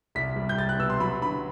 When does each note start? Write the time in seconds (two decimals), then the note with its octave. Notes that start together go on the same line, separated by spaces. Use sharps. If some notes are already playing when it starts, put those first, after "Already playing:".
0.15 C2 B6
0.36 G3
0.49 G6
0.58 C2 A6
0.69 F#6
0.79 B2 E6
0.90 C6
1.00 F#3 B5
1.22 D3 B5